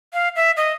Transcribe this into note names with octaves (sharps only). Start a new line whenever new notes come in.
F5
E5
D#5